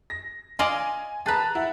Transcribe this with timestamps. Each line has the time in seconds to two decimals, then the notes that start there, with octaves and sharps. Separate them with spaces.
0.10 A#6
0.59 F4 D5 D#5 G#5
1.26 G#4 B4 A5 A#5 F#6 A6
1.55 E4 F#5